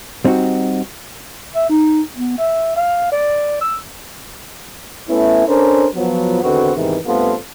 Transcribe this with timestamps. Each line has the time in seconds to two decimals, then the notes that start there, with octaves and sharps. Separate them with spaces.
0.24 G3 C4 D#4 F4 F#4
1.55 E5
1.69 D#4
2.16 B3
2.38 E5
2.76 F5
3.12 D5
3.61 E6
5.09 A3 B3 C#4 E4
5.47 C#4 D4 A4 A#4 C5
5.95 F3 F#3 B3
6.43 E2 D3 D#3 C4 F#4 B4
6.76 E2 G#2 C3 D#3 E3
7.07 G2 A3 B3 C4 F4 A4